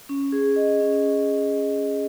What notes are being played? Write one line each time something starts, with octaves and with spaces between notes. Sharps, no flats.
C#4
G#4
D#5
C#4